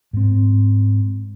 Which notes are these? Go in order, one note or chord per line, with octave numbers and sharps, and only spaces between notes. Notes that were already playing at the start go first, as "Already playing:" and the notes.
G#2 C4